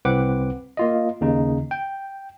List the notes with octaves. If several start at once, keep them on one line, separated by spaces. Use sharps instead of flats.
C2 C4 B4 F#5 D6
A#3 F4 D#5
D#2 C#3 D#4
G5